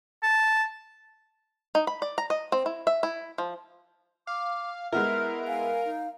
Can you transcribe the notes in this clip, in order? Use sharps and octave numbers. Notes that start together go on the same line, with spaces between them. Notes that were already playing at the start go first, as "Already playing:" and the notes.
A5
D#4
B5
D5
A#5
D#5
C4
E4
E5
E4
F3
F5 D6
G#3 B3 E4 A#4 F6
F5 G#5
D#4